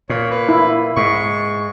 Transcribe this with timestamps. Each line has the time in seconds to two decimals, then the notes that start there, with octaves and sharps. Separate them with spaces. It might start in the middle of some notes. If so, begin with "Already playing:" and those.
0.10 A#2 C#5
0.31 B4
0.49 E4
0.97 G#2 C#6